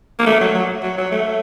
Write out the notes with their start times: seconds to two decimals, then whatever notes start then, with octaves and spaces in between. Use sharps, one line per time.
0.19 A#3
0.26 A3
0.41 F#3
0.54 F#3
0.83 F#3
0.98 F#3
1.11 A3